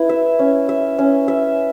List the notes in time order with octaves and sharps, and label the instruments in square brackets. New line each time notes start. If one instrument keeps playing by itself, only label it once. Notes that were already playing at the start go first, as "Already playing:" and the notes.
Already playing: [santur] E4 B4
E5
C#4
E5
C#4
E5